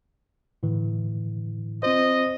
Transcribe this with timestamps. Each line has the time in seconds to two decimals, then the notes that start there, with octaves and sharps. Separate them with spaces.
0.63 A2 D3 E3
1.83 C4 F4 C5 D#5